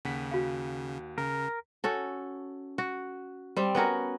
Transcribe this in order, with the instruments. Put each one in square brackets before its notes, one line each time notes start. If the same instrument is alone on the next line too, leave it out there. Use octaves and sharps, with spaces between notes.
[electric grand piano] D#2 F#5 B6 [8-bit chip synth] C#3
[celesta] F#4 F5
[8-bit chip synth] C#3 [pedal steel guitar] A#4
[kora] C#4 F#4 A4
F#4
G3 C4
B3 C#4 F#4 A#4